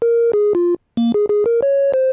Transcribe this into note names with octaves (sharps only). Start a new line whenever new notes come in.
A#4
G#4
F4
A#3
G#4
G#4
A#4
C#5
C5